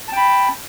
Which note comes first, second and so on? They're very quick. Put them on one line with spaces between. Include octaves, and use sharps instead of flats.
A5 G5 B5